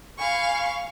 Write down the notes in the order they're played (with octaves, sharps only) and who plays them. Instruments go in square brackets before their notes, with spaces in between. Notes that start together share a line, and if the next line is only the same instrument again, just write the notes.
[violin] F5 C#6 [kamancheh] G#5 B5